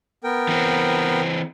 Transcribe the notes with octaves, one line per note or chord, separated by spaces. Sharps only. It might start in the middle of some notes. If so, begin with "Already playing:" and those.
B3 A#4 G5
E3 C4